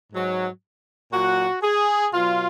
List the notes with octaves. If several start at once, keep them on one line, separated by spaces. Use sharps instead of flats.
G#2 F#3
A#2 F#3 F#4
G#4
B2 F#3 F4